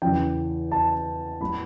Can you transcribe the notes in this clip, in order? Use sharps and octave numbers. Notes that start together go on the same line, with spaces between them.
E2 C#3 E3 G5
A5
A2 G3 B3 B5